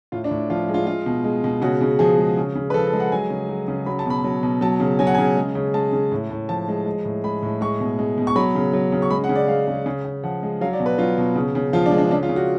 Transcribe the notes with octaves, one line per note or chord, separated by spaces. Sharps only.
A2 F4
D4
A2
F3 F4
G#3
F4
G#3 F4
B2
G#3
B2
C#3 F#4
C#3
F3 G#4
G#3
C#3
C#3
B4
F3 A4
A4
G#3
F#5
F#3 G#5
C#3
F#3
C#3
F#3 B5
A5
B2 B5
F#3
B2
F#3 A5
C#3
F#3 G#5
F#5
C#3 G#5
G#3
C#3
G#3 A5
C#3
A2
A2
F3 A5
G#3
G#3
A2
G#3 B5
A2
G#3 C#6
B2
G#3
B2
C#6
F#3 B5
C#3
F#3
C#3
C#6
G#3 B5
F#5
C#3
D5
G#3 F5
C#3
C#3
C#3
F3 F#5
G#3
F#3 F5
D5
B2
B4
F#3 F4
B2
C#3
C#3
F3 F4
D4
G#3
D4
C#3 D4
F4
C#3
F#4